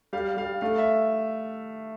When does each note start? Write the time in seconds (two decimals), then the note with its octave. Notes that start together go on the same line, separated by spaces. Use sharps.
0.13 G3 F5
0.37 G3 F5
0.61 A3 F5
0.78 E5